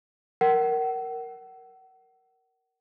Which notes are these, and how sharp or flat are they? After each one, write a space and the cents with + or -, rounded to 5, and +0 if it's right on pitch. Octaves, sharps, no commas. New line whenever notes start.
A#4 +0 F#5 +35